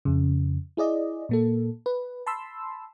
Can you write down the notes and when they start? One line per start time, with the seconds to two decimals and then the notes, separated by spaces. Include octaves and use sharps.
0.05 F2 C#3
0.77 E4 G#4 D5 D#5
1.29 A#2 A#3 A4
1.86 B4
2.26 A5 B5 C6 E6